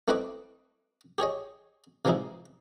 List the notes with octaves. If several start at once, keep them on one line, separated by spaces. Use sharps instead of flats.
A3 C4 E4 B4 D#5 D6
G4 G#4 C#5 D#5
C3 E3 F3 G#3 D#4 E4